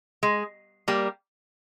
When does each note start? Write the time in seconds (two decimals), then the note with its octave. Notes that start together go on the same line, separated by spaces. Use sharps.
0.23 G#3
0.88 G3 A#3